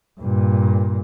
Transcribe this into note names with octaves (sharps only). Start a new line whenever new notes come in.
G2 A#2